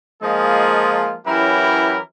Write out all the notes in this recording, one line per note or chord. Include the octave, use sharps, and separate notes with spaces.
F3 G#3 A#3 D#4 F4 G#4
E3 F#3 C#4 E4 G4 A#4